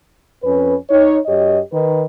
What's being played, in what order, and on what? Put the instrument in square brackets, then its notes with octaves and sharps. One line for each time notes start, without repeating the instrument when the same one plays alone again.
[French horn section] F2 C#4 B4
D#4 C#5
F#2 G4 C#5 D#5
D#3 B4